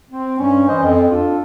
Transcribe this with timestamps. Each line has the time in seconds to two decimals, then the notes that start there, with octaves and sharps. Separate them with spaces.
0.11 C4
0.39 G2 G3 C#4
0.67 E3 C#4 C5 D5 D#5
0.83 F2
1.10 D4 F4 A4